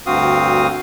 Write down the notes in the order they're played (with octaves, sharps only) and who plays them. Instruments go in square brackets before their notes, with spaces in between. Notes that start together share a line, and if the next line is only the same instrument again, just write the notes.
[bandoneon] D2 G2 C4 F#4 F5 D#6